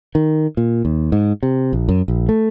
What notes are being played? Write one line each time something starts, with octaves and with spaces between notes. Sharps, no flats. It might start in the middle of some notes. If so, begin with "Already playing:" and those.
D#3
A#2
D#2
G#2
C3
A#1
F#2
A#1
A3